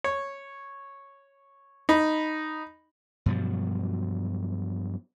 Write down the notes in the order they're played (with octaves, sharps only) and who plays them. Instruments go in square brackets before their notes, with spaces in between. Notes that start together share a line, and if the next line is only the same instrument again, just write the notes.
[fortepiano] C#5
D#4 B5
[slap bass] G2 B2 F3 F#3